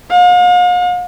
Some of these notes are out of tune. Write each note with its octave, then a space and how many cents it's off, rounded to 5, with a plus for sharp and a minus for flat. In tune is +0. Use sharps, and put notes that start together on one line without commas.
F5 +45